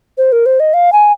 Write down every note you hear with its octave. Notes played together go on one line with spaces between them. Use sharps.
C5
A#4
C5
D#5
F5
G#5